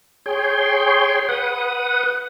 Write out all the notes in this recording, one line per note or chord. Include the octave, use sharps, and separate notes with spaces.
G#4 C#5 G5 C6
B4 F#5 D#6